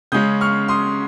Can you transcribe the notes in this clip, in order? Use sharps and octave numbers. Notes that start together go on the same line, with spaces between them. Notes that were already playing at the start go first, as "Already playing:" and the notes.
C#3 G#3 C#4 D#6 G6
C#6 F6
C6 D#6